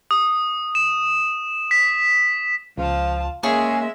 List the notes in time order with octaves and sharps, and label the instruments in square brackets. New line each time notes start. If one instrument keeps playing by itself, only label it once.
[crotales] D#6
E7
B6
[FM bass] C#2 [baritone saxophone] F3 [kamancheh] F4 A5
[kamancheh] G#3 E5 [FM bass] A#3 [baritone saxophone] C#4 [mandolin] G#4